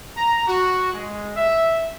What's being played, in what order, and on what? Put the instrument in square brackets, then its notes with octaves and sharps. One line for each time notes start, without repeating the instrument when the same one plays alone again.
[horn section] A#5
F#4
G#3
E5